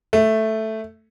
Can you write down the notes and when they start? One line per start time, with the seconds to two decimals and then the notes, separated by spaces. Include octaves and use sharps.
0.13 A3